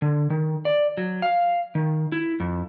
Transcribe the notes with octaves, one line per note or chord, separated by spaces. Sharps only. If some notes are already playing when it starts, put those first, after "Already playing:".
D3
D#3
D5
F#3
F5
D#3
E4
F2